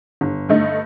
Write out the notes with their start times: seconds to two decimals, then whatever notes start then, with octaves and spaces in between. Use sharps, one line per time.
0.21 G1
0.49 G2 D3 A3 D#4